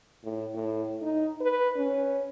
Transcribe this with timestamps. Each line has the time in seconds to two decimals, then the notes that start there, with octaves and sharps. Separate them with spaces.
0.24 A2
0.54 A2
1.02 D#4
1.41 B4
1.77 C#4